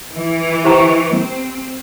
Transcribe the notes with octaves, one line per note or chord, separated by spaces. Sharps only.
E3
G4 C5 G5 A#5 C#6
C4